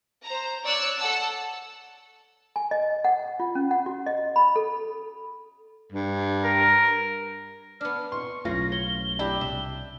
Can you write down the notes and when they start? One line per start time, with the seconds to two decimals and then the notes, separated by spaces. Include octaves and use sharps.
0.24 C5 A#5
0.63 C#5 D5 E6 F#6
0.98 A4 F#5 A5 E6
2.56 G#5
2.71 D#5
3.05 F#5
3.40 F4
3.55 C#4
3.71 F#5
3.86 F#4
4.06 D#5
4.36 B5
4.56 A4
5.92 G2
6.44 A#4
7.81 B3 D4 F6
8.12 C6 C#6
8.45 B1 F#2 A2 C#3 F4 A#6
8.72 C#5 G7
9.19 D4 E4 G4
9.41 C2 E5